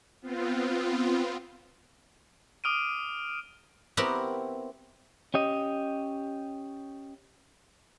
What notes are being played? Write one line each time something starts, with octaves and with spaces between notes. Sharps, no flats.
B3 C4 F4
D6 D#6 F6 D7 D#7
B3 C4 E4 F#4 G4 A#4
C#4 G4 D#5